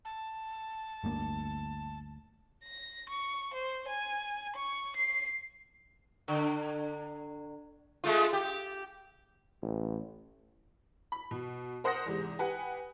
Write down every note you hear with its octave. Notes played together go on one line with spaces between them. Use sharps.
A5
G1 D2 A#3
A#6
C#6
C5
G#5
C#6
C7
D3
G#3 A3 F4
G4
A1
B5
B2
A#4 C5 F#5 D#6 A#6
E2 G#2 C3
G4 B4 F#5 G#5